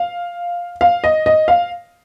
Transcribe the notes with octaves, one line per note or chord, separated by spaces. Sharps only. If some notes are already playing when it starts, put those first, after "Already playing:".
Already playing: F5
F5
D#5
D#5
F5